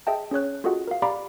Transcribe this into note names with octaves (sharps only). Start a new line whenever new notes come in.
G#4 D#5 E5 G5 A5
C#4 G#4 C#5 F#6
F4 F#4 G#4 A4 D#5 F#5
A#4 F5
G4 D5 F5 A#5 B5 D6